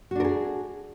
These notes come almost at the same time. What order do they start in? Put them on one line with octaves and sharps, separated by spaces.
F#4 D4 A#4 G#4